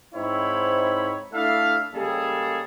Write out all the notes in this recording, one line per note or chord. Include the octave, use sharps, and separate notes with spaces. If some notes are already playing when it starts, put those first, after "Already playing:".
G#2 C4 D#4 E4 C#5 B5
A3 D4 E4 A4 E5 F5
C#3 G3 G#3 A#3 G#4 A4